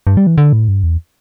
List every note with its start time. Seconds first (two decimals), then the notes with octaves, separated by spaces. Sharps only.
0.07 G2
0.17 G3
0.27 E3
0.38 D3
0.53 A2
0.68 G2
0.83 E2